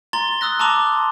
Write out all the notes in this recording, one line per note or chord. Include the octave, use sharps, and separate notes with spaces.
A#5 C6 A6 G7
D#6 E6 F#6 A#6
A5 A#5 C6 D6 F7